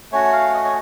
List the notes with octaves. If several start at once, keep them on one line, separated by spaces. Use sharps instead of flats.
A3 C#4 F#4 C#5
F5
D#5
C#5